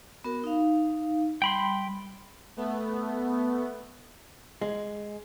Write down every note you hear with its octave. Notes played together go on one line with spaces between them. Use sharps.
B3 F#4 A#4
D#4 F5
G3 G5 B5 C6
A3 B3
G#3